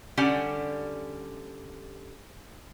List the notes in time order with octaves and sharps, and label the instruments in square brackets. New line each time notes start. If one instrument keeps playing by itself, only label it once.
[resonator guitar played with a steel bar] D3 G3 C#4 G4 F#5 G#5